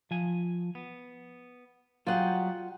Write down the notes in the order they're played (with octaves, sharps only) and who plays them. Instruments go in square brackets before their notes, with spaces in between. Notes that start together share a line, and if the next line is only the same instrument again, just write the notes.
[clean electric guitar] F3 G#5
B3
[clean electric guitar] F#3 G3 G#4 [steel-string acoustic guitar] F4 F#5 G5